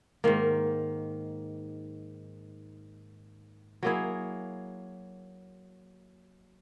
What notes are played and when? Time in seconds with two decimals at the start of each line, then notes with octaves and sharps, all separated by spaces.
0.24 G#2 D#3 A#3
3.83 F#3 A#3 E4 G#4